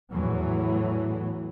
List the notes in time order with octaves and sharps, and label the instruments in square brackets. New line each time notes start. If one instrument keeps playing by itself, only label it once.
[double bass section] E2 A2 E3 F#3